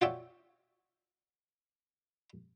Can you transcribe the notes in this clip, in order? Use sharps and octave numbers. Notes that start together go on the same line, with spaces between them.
F4 F#4 C#5 D5 E5 G5